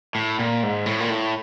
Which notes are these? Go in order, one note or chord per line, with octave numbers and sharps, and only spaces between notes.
A2
A#2
G#2
A2
A#2
A2